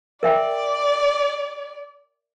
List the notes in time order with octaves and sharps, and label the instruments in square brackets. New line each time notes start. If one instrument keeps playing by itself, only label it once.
[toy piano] A#4 E5 G5 [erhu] D5